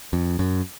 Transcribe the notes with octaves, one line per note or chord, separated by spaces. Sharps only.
F2
F#2